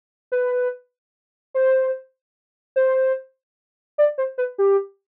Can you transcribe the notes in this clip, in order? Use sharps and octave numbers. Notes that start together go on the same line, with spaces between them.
B4
C5
C5
D5
C5
B4
G4